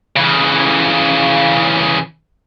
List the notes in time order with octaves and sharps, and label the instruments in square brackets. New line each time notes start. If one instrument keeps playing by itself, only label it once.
[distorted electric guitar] C#3 E3